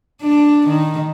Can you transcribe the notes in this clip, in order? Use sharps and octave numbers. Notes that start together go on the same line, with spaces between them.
D4
D#3